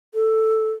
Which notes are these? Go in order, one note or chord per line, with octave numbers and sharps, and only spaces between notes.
A4